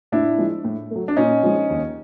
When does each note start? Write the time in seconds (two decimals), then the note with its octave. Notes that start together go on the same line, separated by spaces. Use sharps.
0.12 A2 D4 E4
0.38 F3 G#3
0.64 A2
0.91 F#3 A3
1.08 D4
1.17 A#2 C#4 D#4
1.43 F3 G#3
1.69 D#2